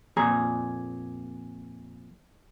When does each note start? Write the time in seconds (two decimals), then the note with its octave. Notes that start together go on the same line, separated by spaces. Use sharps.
0.17 F2 A#2 G#4 A#5